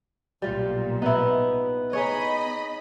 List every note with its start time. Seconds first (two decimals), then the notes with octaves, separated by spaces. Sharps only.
0.42 B1 A#2 G3 F4
1.02 B3 D#4 E4
1.93 D#4 G#4 C#5 D#5 B5